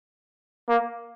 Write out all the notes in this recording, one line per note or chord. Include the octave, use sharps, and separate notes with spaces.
A#3